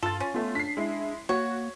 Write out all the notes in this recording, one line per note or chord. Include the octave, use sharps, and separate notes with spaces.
G2 F4 A4 A6
C#4
A3 B3 F4
D4 B6 C7
G#3 E4
A#3 F#4 C#5